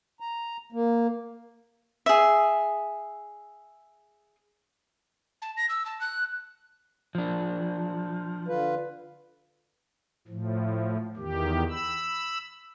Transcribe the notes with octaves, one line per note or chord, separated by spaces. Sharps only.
A#5
A#3
G#4 E5
A5
A#6
E6
A5
F#6
F3 D4
D3 F4 B4
A2 F3
E2 D#3 G4
B5 E6